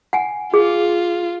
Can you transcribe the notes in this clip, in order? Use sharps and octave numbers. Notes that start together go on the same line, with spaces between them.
F#5 G#5
F4 G#4